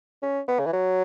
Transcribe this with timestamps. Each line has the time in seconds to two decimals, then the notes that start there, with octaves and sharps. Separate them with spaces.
0.23 C#4
0.48 B3
0.59 C#3
0.66 E3
0.73 F#3